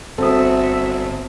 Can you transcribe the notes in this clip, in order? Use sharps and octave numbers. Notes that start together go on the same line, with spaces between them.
G1 C4 F#4 A4 E5 D#6